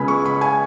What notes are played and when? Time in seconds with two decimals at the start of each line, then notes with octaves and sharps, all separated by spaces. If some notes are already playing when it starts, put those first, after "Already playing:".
Already playing: C#2 C#3 G#3 B3 G#5 B5
0.08 C#6
0.25 B5
0.41 G#5